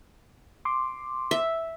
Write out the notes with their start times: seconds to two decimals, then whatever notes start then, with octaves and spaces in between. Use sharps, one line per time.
0.65 C6 D6
1.31 E5